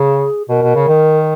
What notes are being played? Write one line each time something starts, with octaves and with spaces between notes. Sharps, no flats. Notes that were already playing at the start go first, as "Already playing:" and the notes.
Already playing: C#3 G#4
B2 A#4
B2
C#3
D#3